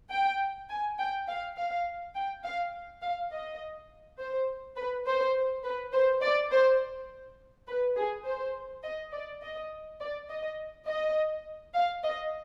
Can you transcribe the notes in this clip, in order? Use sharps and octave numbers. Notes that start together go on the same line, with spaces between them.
G5
G#5
G5
F5
F5
G5
F5
F5
D#5
C5
B4
C5
B4
C5
D5
C5
B4
G#4
C5
D#5
D5
D#5
D5
D#5
D#5
F5
D#5